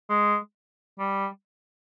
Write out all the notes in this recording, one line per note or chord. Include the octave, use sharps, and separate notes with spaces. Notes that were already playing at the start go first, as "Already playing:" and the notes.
G#3
G3